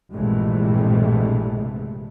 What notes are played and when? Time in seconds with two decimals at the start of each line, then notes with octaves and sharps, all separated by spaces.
0.13 A#1 G2 C3 E3 G#3 A3